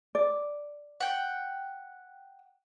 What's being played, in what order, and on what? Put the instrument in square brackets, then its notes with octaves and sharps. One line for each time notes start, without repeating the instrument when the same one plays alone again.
[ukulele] D5
[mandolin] F#5 G5